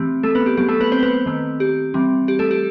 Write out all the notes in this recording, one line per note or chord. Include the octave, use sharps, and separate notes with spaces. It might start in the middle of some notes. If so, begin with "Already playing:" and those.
Already playing: E3 A3 C4 G4
A3 A4
B3 B4
G4
F#3 B3 G4
A3 A4
B3 B4
C4 C5
B3 B4
D#3 A3 C4
G4
E3 G3 C4
G4
A3 A4
G4